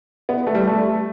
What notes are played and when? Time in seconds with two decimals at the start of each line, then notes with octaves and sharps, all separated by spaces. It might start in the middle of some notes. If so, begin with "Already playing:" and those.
0.29 B3
0.47 A3
0.55 G3
0.67 A3